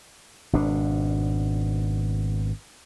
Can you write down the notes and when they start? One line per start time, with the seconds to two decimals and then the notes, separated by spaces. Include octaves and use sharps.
0.53 G#1 B2 D4